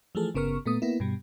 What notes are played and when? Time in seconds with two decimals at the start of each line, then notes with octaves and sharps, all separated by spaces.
0.15 E3 F3 A3 G#4 A4
0.35 G1 C#3 B3 A#4 C#6 F6
0.66 A#2 A3 B3 D#6
0.82 A#3 B3 E4
1.00 G2 B2 G3